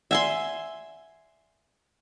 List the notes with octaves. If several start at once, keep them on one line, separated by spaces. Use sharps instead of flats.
D5 E5 F#5 G#5 C6 E6